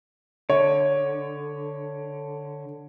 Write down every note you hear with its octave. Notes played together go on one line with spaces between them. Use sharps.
D3 C#5